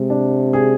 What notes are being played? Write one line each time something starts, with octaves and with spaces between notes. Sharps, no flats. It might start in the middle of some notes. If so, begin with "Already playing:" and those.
Already playing: C3 G#3
D4
G#4